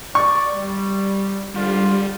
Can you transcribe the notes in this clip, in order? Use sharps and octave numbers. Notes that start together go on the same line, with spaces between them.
D5 C#6
G3
G#2 D3 G3 F4